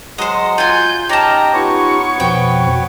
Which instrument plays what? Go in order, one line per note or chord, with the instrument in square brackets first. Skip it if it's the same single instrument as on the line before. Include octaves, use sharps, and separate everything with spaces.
[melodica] F#3 G#3 F#5 [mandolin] C5 D#5
[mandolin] F4 G#5 [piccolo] G6
[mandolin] C#4 A5 [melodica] D#4 G4 G5 [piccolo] A#5
[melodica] B3 B4 C#5 [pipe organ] D#4 F4 G4 [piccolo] C#6
[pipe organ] F2 B2 F3 [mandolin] G5